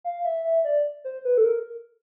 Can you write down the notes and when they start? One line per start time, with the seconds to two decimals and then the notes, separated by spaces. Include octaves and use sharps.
0.04 F5
0.25 E5
0.44 E5
0.65 D5
1.04 C5
1.25 B4
1.38 A4
1.44 A#4